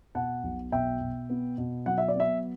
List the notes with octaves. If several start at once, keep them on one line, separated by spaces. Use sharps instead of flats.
B2 F#5 A5
B1
B2 E5 G5
B2
B3
B2
F#3 F#5
E5
D5
B3 E5